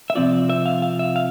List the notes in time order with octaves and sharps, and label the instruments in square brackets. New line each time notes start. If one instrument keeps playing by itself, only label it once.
[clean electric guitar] E5
C3 F3 C4 F4 D5
E5
F5
F5
E5
F5